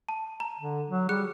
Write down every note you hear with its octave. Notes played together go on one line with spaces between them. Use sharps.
A5
A#5
D3
F#3
G3 G#4 F#6 C#7